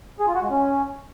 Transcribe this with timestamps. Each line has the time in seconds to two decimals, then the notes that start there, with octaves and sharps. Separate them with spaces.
0.19 G#4
0.27 F4
0.35 F#4
0.43 G#3
0.50 C#4